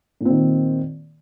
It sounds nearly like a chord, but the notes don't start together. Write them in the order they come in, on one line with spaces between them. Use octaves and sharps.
A#2 C4 D#3